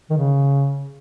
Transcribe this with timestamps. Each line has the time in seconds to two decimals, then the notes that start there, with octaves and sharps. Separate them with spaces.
0.10 D#3
0.17 C#3